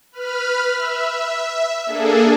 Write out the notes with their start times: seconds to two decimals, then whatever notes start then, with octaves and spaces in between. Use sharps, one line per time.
0.12 B4 B5 F6
0.73 E5
1.86 A#3 D4 G#4 A4